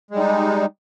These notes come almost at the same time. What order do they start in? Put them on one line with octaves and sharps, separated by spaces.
G#3 G3 D#4